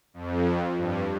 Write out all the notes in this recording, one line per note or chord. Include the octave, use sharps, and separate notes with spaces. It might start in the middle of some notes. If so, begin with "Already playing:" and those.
F2
G2